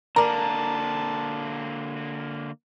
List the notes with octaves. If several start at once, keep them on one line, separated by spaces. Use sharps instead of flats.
D3 A#3 A#4 D5 A5 A#5